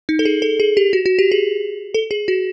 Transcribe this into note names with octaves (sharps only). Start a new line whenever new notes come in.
D#4
A4
G#4
A4
G#4
G4
F#4
F#4
G4
G#4
A4
G#4
F#4